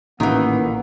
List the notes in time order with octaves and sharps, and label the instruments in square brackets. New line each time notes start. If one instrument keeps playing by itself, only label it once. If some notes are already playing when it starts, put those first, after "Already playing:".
[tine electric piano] A1 [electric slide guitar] A#2 [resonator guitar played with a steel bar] D#3 E3 [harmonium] B3